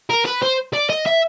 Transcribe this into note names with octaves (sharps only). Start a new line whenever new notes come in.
A#4
B4
C5
D5
D#5
E5